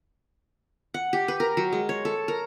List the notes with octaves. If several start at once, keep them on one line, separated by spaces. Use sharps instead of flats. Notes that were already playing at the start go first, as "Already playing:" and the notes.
F#5
G4
B4
A#4
F#3
G#3
C#5
A4
A#4